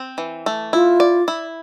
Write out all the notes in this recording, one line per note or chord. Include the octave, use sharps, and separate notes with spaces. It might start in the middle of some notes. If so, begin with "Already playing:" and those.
Already playing: C4
E3
A3
E4 F4
D5
E4